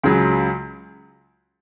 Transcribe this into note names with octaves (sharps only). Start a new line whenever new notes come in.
C#2 C#3 F#3